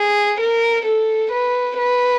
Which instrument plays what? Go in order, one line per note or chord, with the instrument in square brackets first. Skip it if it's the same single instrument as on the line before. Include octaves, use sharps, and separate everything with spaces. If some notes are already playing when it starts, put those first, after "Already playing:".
Already playing: [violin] G#4
A#4
A4
B4
B4